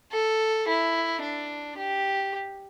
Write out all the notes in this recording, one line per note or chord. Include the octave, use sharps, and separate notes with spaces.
A4
E4
D4
G4